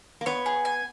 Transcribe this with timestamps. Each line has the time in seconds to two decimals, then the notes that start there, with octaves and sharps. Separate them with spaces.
0.21 A#3
0.26 B3 C#5
0.46 G#4
0.65 G#5